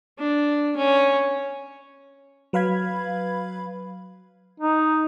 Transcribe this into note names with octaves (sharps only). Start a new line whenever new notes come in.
D4
C#4
F#3 B4 F5 B5 G#6
D#4